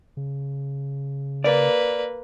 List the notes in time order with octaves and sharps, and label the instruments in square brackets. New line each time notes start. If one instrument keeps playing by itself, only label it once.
[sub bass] C#3
[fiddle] A#3 B4 [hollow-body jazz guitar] D5